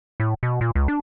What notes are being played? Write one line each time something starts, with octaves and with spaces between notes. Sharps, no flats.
A2
B2
A#2
C#2
D4